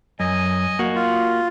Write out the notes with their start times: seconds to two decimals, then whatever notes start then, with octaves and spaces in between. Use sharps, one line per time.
0.20 F#2 D#5 G#5
0.79 A#3 F#4
0.95 F4